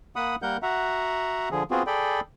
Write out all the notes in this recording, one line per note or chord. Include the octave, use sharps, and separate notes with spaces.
A#3 F#5 B5 D#6
G3 A#3 A#4 F#5 G6
F#4 E5 F#5 A#5
D3 F3 G#4
B3 C4 F4 F#4 G#4
G#4 A4 D5 G5 B5